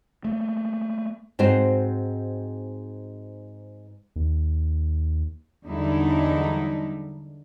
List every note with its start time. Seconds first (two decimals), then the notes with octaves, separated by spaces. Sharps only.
0.24 A3 A#3
1.39 G#2 C4 F#4 C5
4.16 D#2
5.66 E2 D3 F#3 G3 D#4 E4